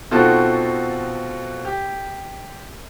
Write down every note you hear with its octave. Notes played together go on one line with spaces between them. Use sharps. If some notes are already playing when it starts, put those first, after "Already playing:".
B2 C4 D#4 F4 F#4 A4
G4